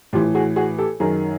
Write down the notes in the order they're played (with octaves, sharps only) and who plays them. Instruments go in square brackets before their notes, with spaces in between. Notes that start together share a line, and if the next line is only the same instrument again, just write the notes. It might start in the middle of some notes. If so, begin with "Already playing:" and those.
[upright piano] A2 E3 F4 G4
F#4 G#4
F#4 G#4
G4 A4
F#2 D#3 G#4 A#4